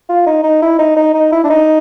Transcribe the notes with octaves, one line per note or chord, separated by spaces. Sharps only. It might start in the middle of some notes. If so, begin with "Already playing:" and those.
F4
D#4
D#4
E4
D#4
D#4
D#4
E4
D4
D#4